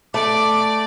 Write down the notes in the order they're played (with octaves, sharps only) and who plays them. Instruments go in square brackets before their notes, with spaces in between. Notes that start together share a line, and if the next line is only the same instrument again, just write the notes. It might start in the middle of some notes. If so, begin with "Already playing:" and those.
[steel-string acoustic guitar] A3 [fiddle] D5 [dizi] D6